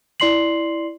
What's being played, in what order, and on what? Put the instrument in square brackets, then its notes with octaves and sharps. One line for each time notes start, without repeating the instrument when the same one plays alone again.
[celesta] E4 D5 C6 C7 F#7